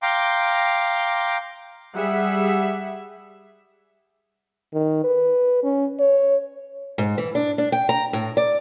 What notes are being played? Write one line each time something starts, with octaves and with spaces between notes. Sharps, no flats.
F5 G5 A#5 C6 D6
G3 G#4 E5 F#5
D#3
B4
C#4
C#5
G#2
E3
D4
D4
G5
A#5
A2
D5